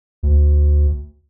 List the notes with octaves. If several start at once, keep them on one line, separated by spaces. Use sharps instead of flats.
D2